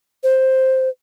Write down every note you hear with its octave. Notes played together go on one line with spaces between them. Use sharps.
C5